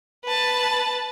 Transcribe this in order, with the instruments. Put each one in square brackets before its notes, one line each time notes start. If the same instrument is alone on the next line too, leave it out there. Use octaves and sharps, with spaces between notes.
[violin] B4 A5